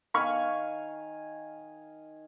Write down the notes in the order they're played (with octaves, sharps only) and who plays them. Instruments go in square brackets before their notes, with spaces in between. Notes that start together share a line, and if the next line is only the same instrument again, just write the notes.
[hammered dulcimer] D#3 [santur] F5 G#5 [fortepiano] B5 C#6 F6